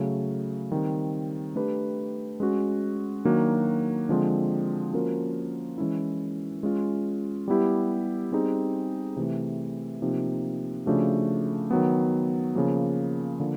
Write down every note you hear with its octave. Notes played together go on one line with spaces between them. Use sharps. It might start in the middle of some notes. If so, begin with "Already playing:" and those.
Already playing: C#3 F#3 A3
D#3 G3 C4
A3 D4 G4 B4
G#3 C#4 F#4
D#3 F#3 A#3 D4 F#4
D3 F3 G#3 C4
F3 A#3 C#4 F#4 A#4
E3 G#3 C#4 E4
G#3 C#4 F4
G3 B3 E4 G4
G3 C4 D#4 G#4
C3 E3 A3
C3 F3 A#3 D#4
C#3 F3 A3 D4 F#4
D#3 F#3 B3
C#3 F3 A#3
D3 F3 A#3